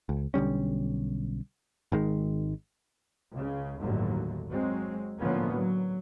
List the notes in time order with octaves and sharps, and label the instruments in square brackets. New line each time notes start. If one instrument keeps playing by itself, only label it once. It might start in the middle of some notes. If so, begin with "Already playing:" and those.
[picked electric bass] C#2
B1 D3 G3 C#4
G#1 D#3 G#3
[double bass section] C#2 C#3
G1 D#2 A2 D3 F#3
F#3 G#3 C4
A2 D3 F3 A#3 B3 C#4
F#3